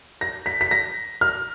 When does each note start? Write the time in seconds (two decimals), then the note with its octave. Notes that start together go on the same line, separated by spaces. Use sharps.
0.21 A#6
0.46 B6
0.61 B6
0.71 A#6
1.21 F6